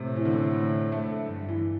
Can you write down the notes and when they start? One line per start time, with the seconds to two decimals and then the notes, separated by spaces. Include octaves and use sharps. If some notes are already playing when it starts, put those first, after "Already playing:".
Already playing: A2 C3
0.16 E3
0.25 D3
0.92 A3
1.25 G2
1.49 E3